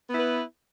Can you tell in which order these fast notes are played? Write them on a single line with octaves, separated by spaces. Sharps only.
B3 E4 B4